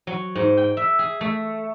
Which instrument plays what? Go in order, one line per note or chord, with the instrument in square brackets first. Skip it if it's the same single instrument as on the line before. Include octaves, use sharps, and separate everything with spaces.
[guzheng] F#3
G#2
G5
E5
G#4
A3